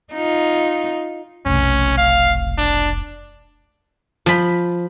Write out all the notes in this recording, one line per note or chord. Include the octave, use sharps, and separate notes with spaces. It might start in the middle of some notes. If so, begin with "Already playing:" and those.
D#4 F4
F1 B1 C#4
F5
D4
F3 B5